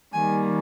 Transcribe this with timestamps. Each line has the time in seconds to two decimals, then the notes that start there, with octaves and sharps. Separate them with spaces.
0.12 D#3 G3 A#3 G#5